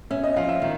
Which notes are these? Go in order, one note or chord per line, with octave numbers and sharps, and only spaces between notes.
C#4 E5
D#5
F3 F5
E5
D#3